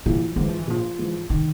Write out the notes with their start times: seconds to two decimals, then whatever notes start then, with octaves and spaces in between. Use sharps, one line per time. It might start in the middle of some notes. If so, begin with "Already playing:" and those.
0.06 A#1 E3
0.36 G#2 E3 F#3
0.48 F3
0.59 E3
0.67 A#1 F3
0.99 G#2 E3
1.30 D#3